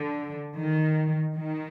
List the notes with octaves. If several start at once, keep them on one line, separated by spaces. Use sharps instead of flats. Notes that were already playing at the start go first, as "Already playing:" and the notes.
Already playing: D3
D#3
D#3